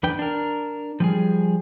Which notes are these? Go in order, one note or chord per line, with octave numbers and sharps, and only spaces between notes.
E2 D4 B4 G5
D4 A#4
F3 G3 G#4